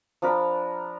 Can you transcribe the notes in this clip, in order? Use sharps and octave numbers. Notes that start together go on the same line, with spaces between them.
F3 D4 A#4 B5